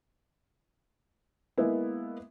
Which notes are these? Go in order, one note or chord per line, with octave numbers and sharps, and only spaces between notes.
G#3 A#3 B3 E4